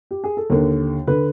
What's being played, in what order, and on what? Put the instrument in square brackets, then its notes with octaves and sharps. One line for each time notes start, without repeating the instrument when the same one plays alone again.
[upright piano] G4
G#4
A4
D#2 D3 A#4
D3 B4